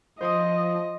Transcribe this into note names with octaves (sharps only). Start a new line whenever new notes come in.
F3 C5 D#5 C6 D#6